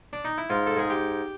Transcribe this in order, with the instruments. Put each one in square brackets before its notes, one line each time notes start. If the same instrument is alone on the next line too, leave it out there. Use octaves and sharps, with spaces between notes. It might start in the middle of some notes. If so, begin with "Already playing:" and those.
[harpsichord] D4
D#4
E4
G#2 F4
A4
G#2 G#4
G4